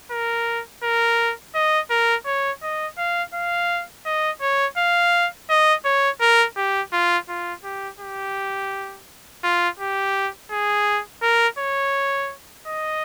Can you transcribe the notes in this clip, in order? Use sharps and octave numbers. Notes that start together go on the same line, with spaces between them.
A#4
A#4
D#5
A#4
C#5
D#5
F5
F5
D#5
C#5
F5
D#5
C#5
A#4
G4
F4
F4
G4
G4
F4
G4
G#4
A#4
C#5
D#5